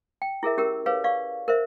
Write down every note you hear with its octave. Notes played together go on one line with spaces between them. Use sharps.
G5
E4 G#4 A#4 E5
C#4 G4 A#4 E6
G#4 B4 C#5 F5
D5 F5 C#6
A#4 C5 E5